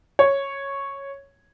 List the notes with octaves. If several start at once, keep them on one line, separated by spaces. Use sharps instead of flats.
C#5